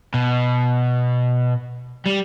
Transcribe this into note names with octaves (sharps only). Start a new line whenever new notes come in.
B2
G3